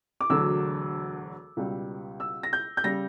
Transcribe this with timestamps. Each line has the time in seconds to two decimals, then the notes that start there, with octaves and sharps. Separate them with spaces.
0.21 D6
0.30 E1 D2 D3 F#3 E6
1.57 C#2 B2 G3
2.20 E6
2.43 A#6
2.53 G6
2.77 G6
2.84 C#3 G3 A#6